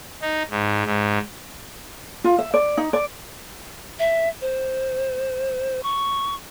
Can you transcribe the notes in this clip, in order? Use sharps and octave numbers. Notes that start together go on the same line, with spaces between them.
D#4
G#2
G#2
F4
E5
D5
D#4
D5
E5
C5
C#6